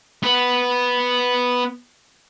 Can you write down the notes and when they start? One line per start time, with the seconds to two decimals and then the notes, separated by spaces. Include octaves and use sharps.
0.23 B3 B4